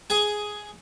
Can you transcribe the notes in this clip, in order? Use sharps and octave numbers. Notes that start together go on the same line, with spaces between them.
G#4 G#5